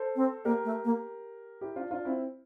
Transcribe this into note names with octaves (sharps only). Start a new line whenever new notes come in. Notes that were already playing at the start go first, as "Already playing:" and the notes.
Already playing: A4 C5
C4
A#3 G4 A#4
A3
A#3
E4 G4
D4 F4
D4 F4
C4 E4